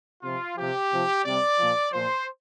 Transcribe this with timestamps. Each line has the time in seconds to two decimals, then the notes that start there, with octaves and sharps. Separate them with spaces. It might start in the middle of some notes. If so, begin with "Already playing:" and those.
0.23 C3 F3 F4
0.56 C3 F3 G4
0.91 C3 F3
1.25 C3 G3 D5
1.59 A#2 F3
1.93 A#2 F3 C5